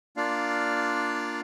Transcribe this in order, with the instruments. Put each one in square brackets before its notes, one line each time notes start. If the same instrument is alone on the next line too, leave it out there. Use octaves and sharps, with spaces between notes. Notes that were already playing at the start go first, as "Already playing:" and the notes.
[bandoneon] A#3 D4 F4 D5 F5